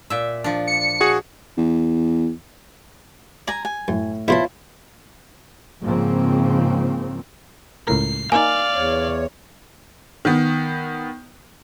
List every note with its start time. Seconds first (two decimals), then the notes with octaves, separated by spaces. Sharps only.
0.10 A#2 E5
0.44 F3 D4
0.67 C#7
1.01 F#4 G#4
1.57 E2
3.48 D5 G#5 A#5
3.65 G#5
3.88 F#2 A2
4.28 A#1 B2 E4 F4 C5 C#5 A5 B5
5.82 G#2 C#3 F3 A#3 C4
7.87 C#2 A2 A#4 C7
8.32 A#3 D#4 D5 F5 G#5
8.75 E2 C#5
10.25 D#3 B3